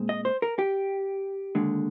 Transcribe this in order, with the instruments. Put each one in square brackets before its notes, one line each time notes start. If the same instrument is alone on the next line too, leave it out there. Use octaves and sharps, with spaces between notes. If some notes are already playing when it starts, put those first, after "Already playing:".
Already playing: [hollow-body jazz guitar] A#2 G#3 C4
D#5
C5
A#4
G4
D#2 D3 G#3